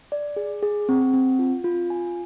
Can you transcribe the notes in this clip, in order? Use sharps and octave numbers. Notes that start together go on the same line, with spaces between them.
D5
G#4
G#4
C4
C4
F4
F4
G#5